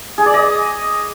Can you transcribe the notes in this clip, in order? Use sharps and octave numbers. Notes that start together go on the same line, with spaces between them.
G#4
D5
D#5